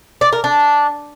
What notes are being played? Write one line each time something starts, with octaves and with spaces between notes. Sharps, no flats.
D5
A#4
D4